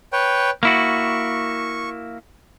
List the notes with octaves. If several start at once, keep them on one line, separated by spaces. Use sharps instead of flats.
B4 C#5 G5
A#3 E4 F#4 C#6